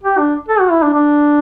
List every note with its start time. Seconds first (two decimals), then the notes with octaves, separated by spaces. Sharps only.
0.04 G4
0.18 D4
0.49 A4
0.60 F#4
0.71 E4
0.82 D4
0.94 D4